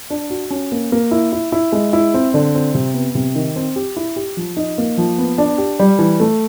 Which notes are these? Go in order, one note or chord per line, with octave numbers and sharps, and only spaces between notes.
D4
F#4
C#4
A#3
A#3
E4
E4
E4
G#3
E4
C4
D3
C4
C3
B3
C3
D#3
C4
G4
E4
G4
F3
D#4
A#3
F3
B3
D4
G4
G3
E3
A3